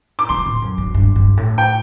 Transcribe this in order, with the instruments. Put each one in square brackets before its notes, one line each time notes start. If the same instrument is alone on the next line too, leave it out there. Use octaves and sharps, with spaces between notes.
[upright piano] D6
[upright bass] C3 [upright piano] C6
[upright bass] A2
F#2
G2
G2
G2
A2
[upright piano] G5